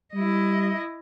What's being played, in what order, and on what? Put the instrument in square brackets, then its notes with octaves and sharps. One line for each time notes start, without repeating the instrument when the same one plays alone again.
[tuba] G3 [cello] E4 D#5